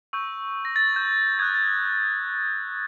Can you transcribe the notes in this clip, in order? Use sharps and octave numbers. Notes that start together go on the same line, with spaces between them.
C#6 E6 G6
A#6
A6
G6
D#6 F#6 G#6
A6